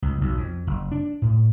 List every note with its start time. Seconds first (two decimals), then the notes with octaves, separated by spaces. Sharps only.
0.02 C#2
0.21 B1
0.37 F2
0.67 F#1
0.92 D4
1.22 A2